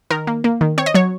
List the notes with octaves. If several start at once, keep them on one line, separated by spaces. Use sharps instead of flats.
D#3 A#4
A#3
A#3
D#3
C4 C#5
D#5
F#3 C#5